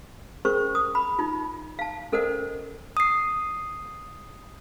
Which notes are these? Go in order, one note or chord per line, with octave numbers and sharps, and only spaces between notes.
C#4 G#4 A#4 C5 C#6
D#6
B5
D#4 F4
F5 A5
C#4 A4 A#4 C5 D#5 F#5
D#6 C7